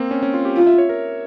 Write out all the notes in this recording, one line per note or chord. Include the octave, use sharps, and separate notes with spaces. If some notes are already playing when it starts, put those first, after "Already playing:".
Already playing: A#3 C4
C#4
C#4
F4
G4
F4
E5
C#5
A#4